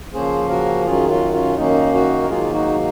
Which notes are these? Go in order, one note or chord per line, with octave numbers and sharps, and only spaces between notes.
C#3 F3 A#3 C#4 G#4 C5
F#4 A#4
F#2 D#3 F#3 C#4 F4 G#4
C#4 F4
C#4 F4
F#2 D#3 A#3 C#4 D#4
D#4 F#4
A#4
G#2 D#3 F#3 A#3 F4 G#4
D#4 F#4